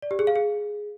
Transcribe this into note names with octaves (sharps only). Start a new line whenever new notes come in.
D5
G4
G#4
F5
G#4